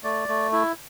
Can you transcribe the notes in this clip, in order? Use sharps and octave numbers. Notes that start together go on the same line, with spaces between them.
A3 D5
A3
E4